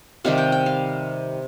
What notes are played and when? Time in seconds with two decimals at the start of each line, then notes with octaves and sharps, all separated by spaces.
0.24 C3 D#3 G3 F5
0.38 G5
0.52 G5
0.66 F5